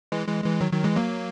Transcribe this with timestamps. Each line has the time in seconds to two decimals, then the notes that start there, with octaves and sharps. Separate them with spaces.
0.12 E3 G#3
0.28 E3 G#3
0.44 E3 G#3
0.61 D#3 F#3
0.72 D#3 F#3
0.84 E3 G#3
0.95 F#3 A#3